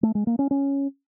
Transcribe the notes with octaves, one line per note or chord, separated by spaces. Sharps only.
A3
G#3
A#3
C#4
C#4